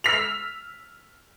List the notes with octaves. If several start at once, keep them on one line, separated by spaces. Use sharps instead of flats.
E6 F6 B6 F7